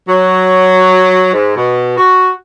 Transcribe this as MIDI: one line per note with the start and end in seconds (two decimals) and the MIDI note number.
0.08 1.32 54
1.33 1.56 44
1.56 1.97 47
1.97 2.30 66